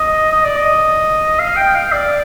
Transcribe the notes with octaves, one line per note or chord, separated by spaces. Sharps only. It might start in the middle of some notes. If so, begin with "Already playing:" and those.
Already playing: D#5
D#5
D5
D#5
F5
G5
F5
D5